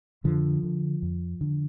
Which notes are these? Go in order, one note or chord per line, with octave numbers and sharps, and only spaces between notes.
F2 D3 F3
D3
F2
D3